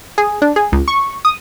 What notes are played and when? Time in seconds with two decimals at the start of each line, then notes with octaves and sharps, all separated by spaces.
0.18 G#4
0.42 D4
0.56 G#4
0.72 C#2
0.88 C#6
1.25 D#6